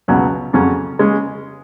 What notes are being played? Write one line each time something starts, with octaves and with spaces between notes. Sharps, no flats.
C#2 B2 F#3 C#4
F2 C#3 F#3 C#4
C#3 G#3 C#4